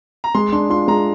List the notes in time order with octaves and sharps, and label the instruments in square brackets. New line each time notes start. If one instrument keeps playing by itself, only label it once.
[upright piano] A#5
[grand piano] G#3 [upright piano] C6
[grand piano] D4 [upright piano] C6
[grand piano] F4 [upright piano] C6
[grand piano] G#3 [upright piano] A#5